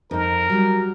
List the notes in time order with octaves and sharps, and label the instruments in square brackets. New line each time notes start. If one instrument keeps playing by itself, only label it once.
[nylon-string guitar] F2 D#4 [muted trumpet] A#4
[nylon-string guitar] F#3 G3